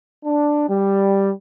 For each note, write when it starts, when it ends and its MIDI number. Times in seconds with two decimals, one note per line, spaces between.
0.24 0.66 62
0.68 1.30 55